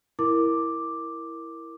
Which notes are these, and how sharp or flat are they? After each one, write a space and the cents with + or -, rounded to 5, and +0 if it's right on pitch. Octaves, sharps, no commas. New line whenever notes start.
E4 +0 A#4 +0 D6 +0